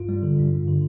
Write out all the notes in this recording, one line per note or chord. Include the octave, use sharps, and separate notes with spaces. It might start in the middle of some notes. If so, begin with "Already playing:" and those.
Already playing: G2 F4
G3
D3
G2
G2
D3